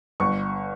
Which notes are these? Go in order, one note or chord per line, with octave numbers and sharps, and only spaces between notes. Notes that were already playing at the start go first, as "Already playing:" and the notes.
G1 C#6